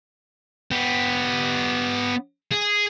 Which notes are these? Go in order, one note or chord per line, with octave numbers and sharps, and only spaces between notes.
B3 G4
G#4